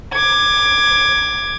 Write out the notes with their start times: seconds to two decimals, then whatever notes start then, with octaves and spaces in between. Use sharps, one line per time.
0.13 D6 G#6